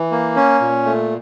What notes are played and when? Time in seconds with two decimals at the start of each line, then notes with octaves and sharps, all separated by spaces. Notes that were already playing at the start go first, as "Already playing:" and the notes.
Already playing: E3
0.11 A#3
0.36 C#4
0.61 A#2
0.85 A3